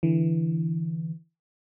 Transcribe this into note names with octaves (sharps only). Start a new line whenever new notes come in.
D3 E3